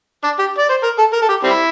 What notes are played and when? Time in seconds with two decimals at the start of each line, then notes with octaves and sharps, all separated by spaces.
0.24 D4
0.39 G4
0.58 D5
0.69 C5
0.84 A#4
0.99 A4
1.13 A#4
1.22 A4
1.29 G4
1.44 G3 C4 E4